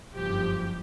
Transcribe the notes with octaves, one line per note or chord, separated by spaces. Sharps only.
F#1 G2 F3 G4